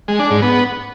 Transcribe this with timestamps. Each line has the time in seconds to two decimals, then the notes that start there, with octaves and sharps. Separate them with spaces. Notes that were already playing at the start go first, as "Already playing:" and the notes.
0.08 G#3
0.20 D4
0.31 G#2
0.42 B3